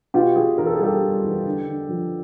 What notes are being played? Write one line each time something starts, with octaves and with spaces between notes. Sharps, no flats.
B2 F4 G4
B2 F#4 G#4
E2 A#4
A4
G#4
G3 G4 A4
G3
E2
D3
D3
F3